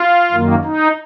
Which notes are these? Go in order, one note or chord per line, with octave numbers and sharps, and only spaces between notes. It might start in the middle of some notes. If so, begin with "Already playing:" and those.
Already playing: F4
F#2 D#3 A#3
D#4